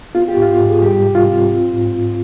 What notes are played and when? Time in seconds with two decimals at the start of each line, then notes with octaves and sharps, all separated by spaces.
0.15 B3 F4
0.28 G4
0.37 G#2 F4
0.60 G#2
0.69 G#4
0.82 G3 G4
1.04 C3
1.15 F4
1.26 C4
1.49 C4
1.72 G#2
1.93 G#2